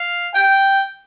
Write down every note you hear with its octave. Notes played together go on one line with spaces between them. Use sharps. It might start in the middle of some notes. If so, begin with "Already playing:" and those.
Already playing: F5
G5